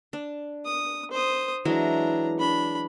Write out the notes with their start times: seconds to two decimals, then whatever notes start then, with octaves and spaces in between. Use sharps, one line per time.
0.13 D4
0.65 D#6
1.11 C5 D#6
1.65 E3 F#3 G#3 D4 A#5
2.38 D4 B5